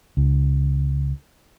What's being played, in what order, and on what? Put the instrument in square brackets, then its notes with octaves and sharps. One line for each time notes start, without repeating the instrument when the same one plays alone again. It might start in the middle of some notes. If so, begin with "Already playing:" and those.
[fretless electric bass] C#2